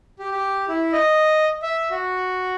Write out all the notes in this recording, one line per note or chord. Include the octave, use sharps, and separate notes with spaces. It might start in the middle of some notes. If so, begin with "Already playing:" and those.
G4
G4
E4
D#5
E5
F#4